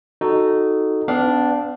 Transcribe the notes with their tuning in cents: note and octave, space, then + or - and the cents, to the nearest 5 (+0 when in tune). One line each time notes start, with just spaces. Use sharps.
D#4 -10 F#4 +0 A4 +0
B3 +40 D4 -5 F5 +5